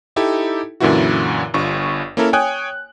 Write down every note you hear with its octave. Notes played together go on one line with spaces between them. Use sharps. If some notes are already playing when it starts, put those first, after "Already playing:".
D#4 E4 G4 A4
F#2 A#2 D3 E3 E4 F#4
G1 G2 F4 C#6
A#3 C#4 E4 A4 A#4
C#5 G5 G#5 D#6 F#6